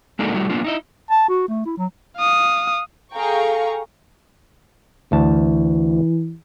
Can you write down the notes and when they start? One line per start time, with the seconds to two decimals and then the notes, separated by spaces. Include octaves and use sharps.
0.19 G#3 A#3 D4 D#4 F#4 A4
0.34 G3 A3 E4 F#4
0.49 A#3 B3 D4 F4
0.64 D#4 E4 D#5
1.10 A5
1.29 F#4
1.48 A3
1.66 E4
1.77 F#3
2.17 F5 D#6
3.14 G#4 A4 F5 G5 A#5 C#6
5.12 D2 E3 A5